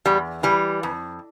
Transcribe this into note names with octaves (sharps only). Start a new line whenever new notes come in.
E2 G3
E3 G3
F2